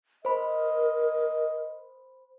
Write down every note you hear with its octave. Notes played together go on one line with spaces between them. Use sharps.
A#4 C5 D#5 B5